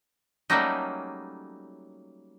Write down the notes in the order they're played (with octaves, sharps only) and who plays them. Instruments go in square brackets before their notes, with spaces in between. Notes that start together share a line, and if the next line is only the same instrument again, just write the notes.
[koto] F#3 G3 A3 A#3 C#4 D#4